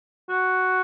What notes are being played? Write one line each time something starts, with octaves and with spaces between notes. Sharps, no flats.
F#4